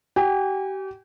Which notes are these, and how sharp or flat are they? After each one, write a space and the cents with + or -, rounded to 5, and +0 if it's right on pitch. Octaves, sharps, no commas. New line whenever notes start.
G4 -35 G#5 -40